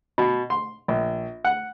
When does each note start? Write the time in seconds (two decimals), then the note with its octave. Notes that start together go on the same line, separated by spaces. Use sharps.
0.18 B2
0.50 C6
0.88 A#1
1.44 F#5